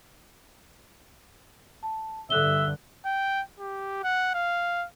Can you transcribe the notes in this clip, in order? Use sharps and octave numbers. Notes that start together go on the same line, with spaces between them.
A5
G2 D3 A4 E5 F#6 G7
G5
G4
F#5
F5